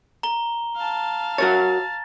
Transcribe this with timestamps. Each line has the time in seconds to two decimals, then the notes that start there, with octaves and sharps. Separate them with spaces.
0.23 A#5 G7
0.77 F5 A5
1.38 F#4 A#4 C#5 A6